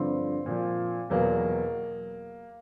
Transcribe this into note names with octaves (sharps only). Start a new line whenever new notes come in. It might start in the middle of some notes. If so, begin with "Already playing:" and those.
Already playing: G2 D3 F3 C4
A#2 F3
E2 B2 F#3 A#3